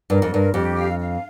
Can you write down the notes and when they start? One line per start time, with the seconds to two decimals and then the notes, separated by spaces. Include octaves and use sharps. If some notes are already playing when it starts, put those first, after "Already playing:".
0.10 G2 A#4
0.22 F2
0.32 G2 A#4
0.54 F2 G4
0.76 F5
0.99 F5